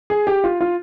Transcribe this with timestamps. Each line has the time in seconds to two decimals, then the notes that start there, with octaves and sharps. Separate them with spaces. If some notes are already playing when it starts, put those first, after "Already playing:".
0.10 G#4
0.27 G4
0.44 F4
0.61 F4